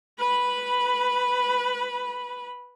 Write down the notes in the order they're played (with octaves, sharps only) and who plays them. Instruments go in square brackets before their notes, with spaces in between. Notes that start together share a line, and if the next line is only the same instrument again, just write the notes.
[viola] B4 B5